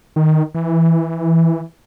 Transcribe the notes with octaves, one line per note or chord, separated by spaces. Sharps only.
D#3
E3